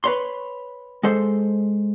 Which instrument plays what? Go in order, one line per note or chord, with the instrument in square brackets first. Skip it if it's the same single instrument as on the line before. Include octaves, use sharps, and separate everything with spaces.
[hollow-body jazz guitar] B4 C#5 C6
G#3 A4 C5